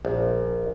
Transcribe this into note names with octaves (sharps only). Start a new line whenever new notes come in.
A#1